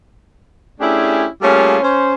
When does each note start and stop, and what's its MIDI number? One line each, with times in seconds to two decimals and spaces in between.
0.80 1.25 57
0.80 1.25 61
0.80 1.25 62
0.80 1.25 64
0.80 1.25 67
0.80 1.25 68
1.42 1.78 55
1.42 1.78 57
1.42 1.78 58
1.42 1.78 61
1.42 1.78 65
1.42 1.78 68
1.82 2.15 61
1.82 2.15 72